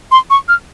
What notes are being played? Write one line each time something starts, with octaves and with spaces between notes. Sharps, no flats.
C6
C#6
F6